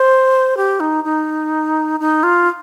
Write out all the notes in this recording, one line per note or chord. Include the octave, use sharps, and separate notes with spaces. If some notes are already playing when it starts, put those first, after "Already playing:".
Already playing: C5
G4
D#4
D#4
D#4
F4